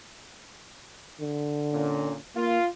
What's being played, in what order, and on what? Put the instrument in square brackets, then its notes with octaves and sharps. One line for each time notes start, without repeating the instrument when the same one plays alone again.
[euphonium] D3
[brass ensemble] A#2 C#4
[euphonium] A#3 [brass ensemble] F4